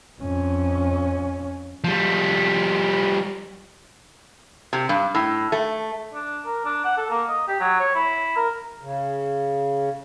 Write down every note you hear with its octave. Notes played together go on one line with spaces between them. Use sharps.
F2 C#4
F3 G3
C3
G2
A2
A3
D4
A#4
D4
F#5
A4
A#3
D#5
G4
F#3
C#5
E4
A#4
C#3